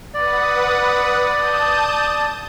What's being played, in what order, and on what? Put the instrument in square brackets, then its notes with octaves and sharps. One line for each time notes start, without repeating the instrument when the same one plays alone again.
[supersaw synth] B4 F#5 D#6 [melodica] D5
[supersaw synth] A5 D#6 G6